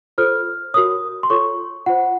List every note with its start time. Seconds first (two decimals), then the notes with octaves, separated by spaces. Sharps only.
0.18 F4 A4 C5 F6
0.74 F#4 A#4 C#5 D#6
1.23 C6
1.30 F4 A4 C#5 C#6
1.86 F4 C5 F#5